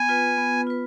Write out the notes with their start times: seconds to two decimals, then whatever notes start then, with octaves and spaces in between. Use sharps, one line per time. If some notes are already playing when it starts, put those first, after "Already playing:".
Already playing: B3 G#5
0.09 F4 B4
0.38 B3
0.67 F4 B4